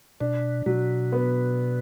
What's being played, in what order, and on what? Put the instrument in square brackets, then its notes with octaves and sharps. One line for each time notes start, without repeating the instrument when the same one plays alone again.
[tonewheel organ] B2 [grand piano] D4
[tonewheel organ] B2 [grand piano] F#3
[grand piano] B3